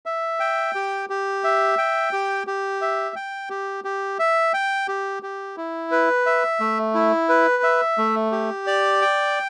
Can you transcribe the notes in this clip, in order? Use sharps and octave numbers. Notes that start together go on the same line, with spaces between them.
E5
G5
G4
G4
E5
G5
G4
G4
E5
G5
G4
G4
E5
G5
G4
G4
E4
B4
E5
A3
E4
B4
E5
A3
G4
D5
G5